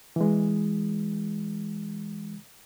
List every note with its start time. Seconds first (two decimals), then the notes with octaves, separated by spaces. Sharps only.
0.16 E3 G#3